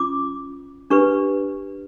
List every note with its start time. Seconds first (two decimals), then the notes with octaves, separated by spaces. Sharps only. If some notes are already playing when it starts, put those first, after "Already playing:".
Already playing: C#4 F4 D6
0.90 D4 G4 B4 C#6